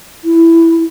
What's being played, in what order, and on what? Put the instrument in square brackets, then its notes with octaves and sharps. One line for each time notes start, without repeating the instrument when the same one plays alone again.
[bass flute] E4